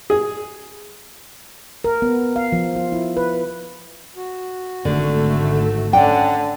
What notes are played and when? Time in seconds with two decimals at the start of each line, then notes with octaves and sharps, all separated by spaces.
0.10 G#4
1.84 A#4
2.02 B3
2.36 F5
2.52 F3
2.76 F4
2.92 E4
3.17 B4
4.16 F#4
4.85 G#1 D3 A3
5.93 D3 C#4 D5 F#5 G5